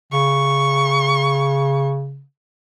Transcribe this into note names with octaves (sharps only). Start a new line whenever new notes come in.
C#3 C#6